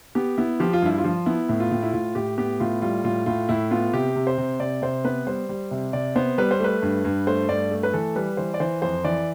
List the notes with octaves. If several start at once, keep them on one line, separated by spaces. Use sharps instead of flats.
B3 G4
B3 E4
F3 G4
F4
G2 E4
F4
F3
B3 E4
A2
F4
A2
E4
A2 F4
A2 G4
B3 G4
A2 F4
G3 F4
A2 F4
A2 F4
A2 E4
B3 F4
C3 G4
C3
C5
C3
C3 D5
C3 C5
B3 B4
G3 C5
G3
C3
C3 D5
B3 C5
G3 B4
C5
A3 B4
G2
G2
A3 C5
G2 D5
A3
B4
E3 A4
G3 B4
E3 C5
D5
E3 C5
F2 C5
E3 D5